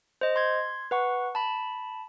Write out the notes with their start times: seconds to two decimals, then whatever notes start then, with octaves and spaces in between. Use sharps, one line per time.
0.21 C5 D#5
0.36 C6 G#6
0.91 B4 F#5 C#6
1.35 A5 B5